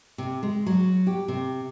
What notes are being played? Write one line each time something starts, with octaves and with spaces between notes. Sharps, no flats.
C3
G#3
F#3
G4
C3